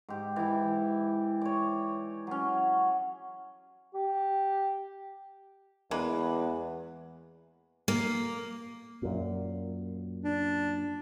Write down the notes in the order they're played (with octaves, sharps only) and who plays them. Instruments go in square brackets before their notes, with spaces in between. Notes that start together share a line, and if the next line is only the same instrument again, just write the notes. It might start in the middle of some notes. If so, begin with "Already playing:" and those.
[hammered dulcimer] G#2 G4
E3 E4
C#5 D5
F#3 C#4
[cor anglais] G4
[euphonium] E2 [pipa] G#3 A#3 B4
[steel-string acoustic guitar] A#3
[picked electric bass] F#2 A#2
[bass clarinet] D4